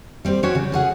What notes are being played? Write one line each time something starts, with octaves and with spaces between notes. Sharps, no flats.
G3 C4 G4 C5
F#3 C#4 F#4 G4 C5 C#5
C#3
C#4 G#4 F#5